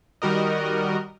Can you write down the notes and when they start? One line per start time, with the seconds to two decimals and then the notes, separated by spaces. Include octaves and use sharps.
0.22 D#3 G3 F#4 A#4 D#5